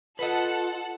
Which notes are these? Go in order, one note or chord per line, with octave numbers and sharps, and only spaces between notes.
F4 A4 B4 D#5 F#5 A5